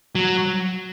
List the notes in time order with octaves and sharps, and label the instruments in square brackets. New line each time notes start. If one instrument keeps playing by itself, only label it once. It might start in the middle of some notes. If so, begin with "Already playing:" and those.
[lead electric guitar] F#3